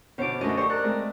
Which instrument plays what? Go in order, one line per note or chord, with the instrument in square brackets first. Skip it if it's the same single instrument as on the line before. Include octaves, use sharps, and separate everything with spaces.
[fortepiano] B2 D3 F#4 [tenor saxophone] C#4 [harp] C5 D6
[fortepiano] F#2 D3 A3 [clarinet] F#4 [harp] D#5
[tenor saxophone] G3 [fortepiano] A4 C5 [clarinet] C#6
[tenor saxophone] A#4 [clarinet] D5 [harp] F#6
[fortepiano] G#3 A3 C4